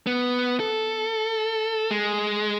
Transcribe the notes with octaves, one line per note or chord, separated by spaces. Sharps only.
B3
A4
G#3